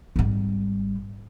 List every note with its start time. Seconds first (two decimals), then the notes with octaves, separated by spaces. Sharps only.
0.16 G#1 G3